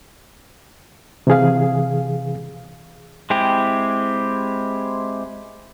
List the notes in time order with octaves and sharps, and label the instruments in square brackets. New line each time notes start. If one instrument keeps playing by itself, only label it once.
[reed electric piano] C3 E3 G#4 F5
[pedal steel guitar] G#3 C4 E4 G4